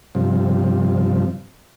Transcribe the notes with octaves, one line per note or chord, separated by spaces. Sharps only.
G2 C3 F3